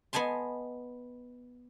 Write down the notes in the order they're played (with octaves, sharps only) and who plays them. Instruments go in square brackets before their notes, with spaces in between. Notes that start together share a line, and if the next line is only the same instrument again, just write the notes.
[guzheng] B3 D#5 G#5 A5 C6